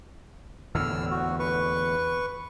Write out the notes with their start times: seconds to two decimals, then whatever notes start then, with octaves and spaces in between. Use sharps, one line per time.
0.75 E2 A2 D3 E6 F6
1.11 F#4
1.39 B4 C#6